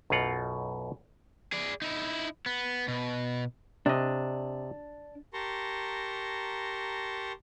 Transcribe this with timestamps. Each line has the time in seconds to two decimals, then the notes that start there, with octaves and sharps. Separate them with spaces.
0.10 B1 F#2 B2 F4 F#5
1.52 G#4 D5
1.82 D#4 E4
2.46 B3
2.88 B2
3.86 C3 D4 D#5
5.33 G4 A#4 A5 A#5 C6 C#6